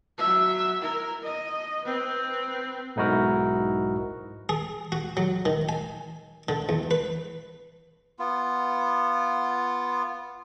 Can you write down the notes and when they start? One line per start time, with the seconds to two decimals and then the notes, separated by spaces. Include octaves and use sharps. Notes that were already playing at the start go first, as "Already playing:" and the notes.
0.18 F#3 E5
0.82 E4 A#4
1.23 D#5
1.85 C4 B4
2.96 B1 G#2 D#4 E4 F#4 A#4
4.49 G#4
4.92 F#4
5.17 F#3
5.46 D#3
5.69 G#5
6.49 D3
6.69 E2
6.91 B4
8.19 B3 F4